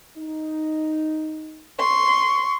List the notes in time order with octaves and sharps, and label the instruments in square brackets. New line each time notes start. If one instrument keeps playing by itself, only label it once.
[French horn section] D#4
[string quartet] C6 [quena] C#6